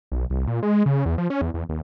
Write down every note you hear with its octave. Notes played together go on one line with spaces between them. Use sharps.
B1
C2
A#2
G#3
C#3
E2
F3
C#4
E2
E2
D#2